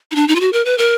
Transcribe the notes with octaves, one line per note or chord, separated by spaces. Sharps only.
D#4
D4
D#4
F4
F#4
A#4
B4
A#4